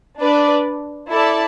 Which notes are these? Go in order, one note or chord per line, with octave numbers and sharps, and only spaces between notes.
D4 B4 D5
E4 A4 D5 A5